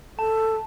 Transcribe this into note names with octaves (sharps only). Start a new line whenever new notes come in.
A4 A5